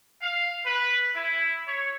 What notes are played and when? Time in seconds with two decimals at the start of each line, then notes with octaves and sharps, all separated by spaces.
0.22 F5
0.65 B4
1.14 E4
1.67 C#5